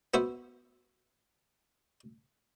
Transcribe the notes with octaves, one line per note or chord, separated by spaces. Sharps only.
B3 F#4 C5 E5